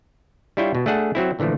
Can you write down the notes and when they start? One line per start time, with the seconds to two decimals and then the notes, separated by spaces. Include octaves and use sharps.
0.57 G3 D4 E4 F4 C#5 G5
0.75 B2
0.86 A3 D4 G#4 F#5 A5
1.15 F#3 C4 E4
1.39 A#2 D3 E3 F3 A3